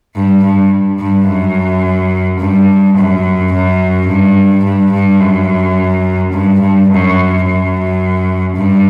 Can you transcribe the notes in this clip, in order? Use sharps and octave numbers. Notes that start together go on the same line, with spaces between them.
G2
G2
G2
F#2
G2
F#2
F#2
G2
G2
G2
F#2
G2
G2
F#2
F#2
G2